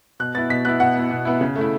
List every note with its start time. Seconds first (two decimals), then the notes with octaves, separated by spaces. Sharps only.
0.20 B2 F#6
0.35 B3 A6
0.38 E4
0.50 B2 B6
0.65 B3 E4 F#6
0.80 B2 F#5
0.95 B3 E4
1.11 B2
1.25 B3 E4
1.41 C#3
1.56 A3
1.61 E4